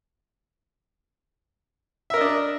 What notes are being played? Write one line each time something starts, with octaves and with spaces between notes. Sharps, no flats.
D4 A#4 D#5 E5